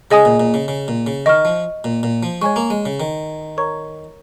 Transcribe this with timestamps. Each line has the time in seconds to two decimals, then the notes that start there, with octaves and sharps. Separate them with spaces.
0.11 C#3 G#4 D#5 G#5 D#6
0.25 A#2
0.40 A#2
0.54 C#3
0.68 C#3
0.88 A#2
1.07 C#3
1.26 D#3 D#5 C#6 F6
1.45 F3
1.84 A#2
2.03 A#2
2.23 F3
2.42 G#3 C#5 G#5 C#6
2.56 A#3
2.70 G#3
2.86 C#3
3.00 D#3
3.57 A#4 C#5 A#5 C#6